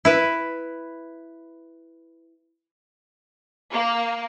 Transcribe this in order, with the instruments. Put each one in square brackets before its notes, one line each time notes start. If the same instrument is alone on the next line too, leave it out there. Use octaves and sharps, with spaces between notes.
[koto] E4 B4
[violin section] A#3